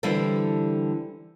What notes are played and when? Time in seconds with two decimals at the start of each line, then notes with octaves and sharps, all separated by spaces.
0.03 D3 E3 G3 E4 A4 C5